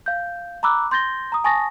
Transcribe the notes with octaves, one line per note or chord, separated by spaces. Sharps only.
F5 G6
A#5 B5 D6 E6 F#6
C6 G6 A6 A#6 G7
A#5 D#6
G#5 A5 C#6 D#6 A6 A#6